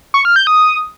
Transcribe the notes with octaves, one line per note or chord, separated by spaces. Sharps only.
C#6
F6
G6
D#6